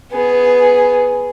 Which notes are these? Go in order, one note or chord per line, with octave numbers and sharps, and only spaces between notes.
B3 G#4